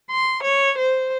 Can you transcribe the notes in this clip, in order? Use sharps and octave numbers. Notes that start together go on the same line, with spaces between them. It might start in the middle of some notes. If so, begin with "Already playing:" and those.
C6
C#5
C5